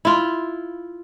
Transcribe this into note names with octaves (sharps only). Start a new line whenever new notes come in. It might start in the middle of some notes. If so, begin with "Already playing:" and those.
E4 F4